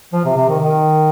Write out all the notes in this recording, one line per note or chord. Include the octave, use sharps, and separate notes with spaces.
F3
C3
C3
D#3
D#3